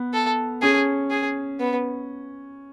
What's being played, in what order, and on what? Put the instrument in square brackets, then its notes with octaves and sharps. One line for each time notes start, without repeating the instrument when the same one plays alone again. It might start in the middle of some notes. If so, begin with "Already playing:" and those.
Already playing: [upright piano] B3
[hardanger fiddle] A4
[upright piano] C#4 [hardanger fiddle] G#4
[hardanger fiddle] G#4
B3